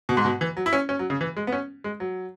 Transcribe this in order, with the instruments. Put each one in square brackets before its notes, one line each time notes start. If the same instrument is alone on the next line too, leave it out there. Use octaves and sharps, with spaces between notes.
[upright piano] B2
G#2
B2
E3
F#3
E4
C#4
C#4
F#3
C#3
E3
G#3
B3
C#4
G#3
F#3